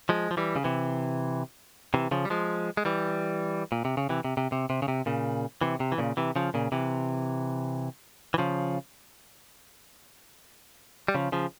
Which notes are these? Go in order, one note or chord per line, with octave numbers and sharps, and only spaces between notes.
F3 G#3
F3
E3 G3
C#3
C3 E3
C3 E3
C#3 F3
G3
F3 G#3
G#3
E3 G3
A#2
C3
C#3
C3 E3
C3
C3
C3
C3
C#3
C3
A#2 C#3
C3 E3
C3
E3
A#2 C#3
C3 E3
C#3 F3
A#2 C#3
C3 E3
E3
C#3 F3
G3
C#3 F3
C#3 F3